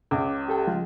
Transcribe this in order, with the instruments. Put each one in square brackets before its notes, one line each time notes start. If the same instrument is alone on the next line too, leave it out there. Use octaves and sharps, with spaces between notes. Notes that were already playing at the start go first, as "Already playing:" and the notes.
[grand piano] C#2 [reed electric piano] D6
[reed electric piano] G4 A4 G5
F3 G#3 F4